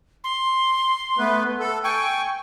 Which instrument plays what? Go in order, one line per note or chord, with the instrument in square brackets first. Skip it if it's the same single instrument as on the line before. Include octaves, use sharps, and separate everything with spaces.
[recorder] C6
[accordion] A3 B3 B4
A4
[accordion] G5 G#5 [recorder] C#6